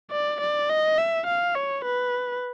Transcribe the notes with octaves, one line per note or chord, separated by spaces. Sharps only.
D5
D5
D#5
E5
F5
C#5
B4